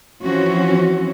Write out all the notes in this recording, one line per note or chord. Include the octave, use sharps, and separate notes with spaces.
E3 F3 C4 C#4 F#4